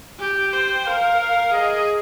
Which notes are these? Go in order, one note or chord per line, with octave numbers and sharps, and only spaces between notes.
G4 G5
C5
A#4 F5
F5
G#4 D#5